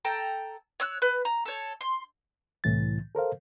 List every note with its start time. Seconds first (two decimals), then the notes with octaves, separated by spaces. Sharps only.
0.05 A4 G5 A#5
0.80 C#5 E6 F#6
1.02 B4
1.25 A#5
1.45 A4 C#5
1.81 C6
2.64 C2 A2 E3 A6
3.15 A4 A#4 C5 F5